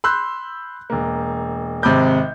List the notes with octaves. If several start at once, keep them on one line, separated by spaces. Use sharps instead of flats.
B5 C6 E6 F#6 G6
E1 A#3
G#1 C3 B5 D6 G6